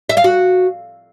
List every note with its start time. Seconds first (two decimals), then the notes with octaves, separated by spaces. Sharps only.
0.09 E5
0.17 F5
0.24 F#4